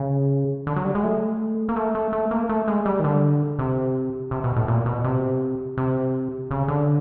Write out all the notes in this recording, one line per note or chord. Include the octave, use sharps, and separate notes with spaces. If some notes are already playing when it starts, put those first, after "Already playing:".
Already playing: C#3
D3
F#3
G3
G#3
A3
A#3
A3
A3
A3
A#3
A3
G#3
G3
D#3
D3
C3
C3
B2
A2
A#2
B2
C3
C3
C#3
D3